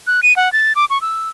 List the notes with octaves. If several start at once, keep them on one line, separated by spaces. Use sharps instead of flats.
F#6
D#7
F#5
A6
D6
C#6
E6